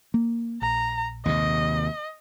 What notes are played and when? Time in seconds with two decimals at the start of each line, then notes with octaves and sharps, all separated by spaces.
0.14 A#3
0.62 A#1 A#5
1.25 D#2 C3 D#5